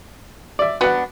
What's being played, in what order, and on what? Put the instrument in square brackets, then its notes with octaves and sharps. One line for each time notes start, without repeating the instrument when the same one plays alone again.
[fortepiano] D5 E5
[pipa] B3 D4 [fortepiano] F#4 F#5